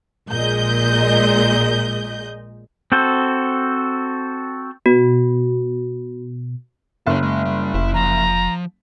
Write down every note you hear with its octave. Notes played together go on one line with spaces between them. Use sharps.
A#1 A#2 G#3 D#5 G6
C4 F#4 A4 C5
B2 F#4
F#1 A4 C#5
G#3
G3
F1 E4
F3 A#5